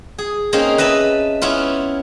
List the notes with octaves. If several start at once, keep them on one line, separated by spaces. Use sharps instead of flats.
G#4
A#3 C4 C#4 D#4 G#4
B4 D#5 E5 A5 B5
B3 C#4 E4 F4